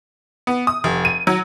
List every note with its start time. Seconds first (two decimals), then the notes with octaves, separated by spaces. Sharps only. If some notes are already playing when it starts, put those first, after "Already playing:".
0.47 B3
0.67 D#6
0.84 F1
1.05 D#7
1.27 F#3